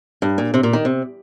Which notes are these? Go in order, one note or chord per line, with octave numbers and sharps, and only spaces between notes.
G2
A#2
C3
A#2
D#3
C3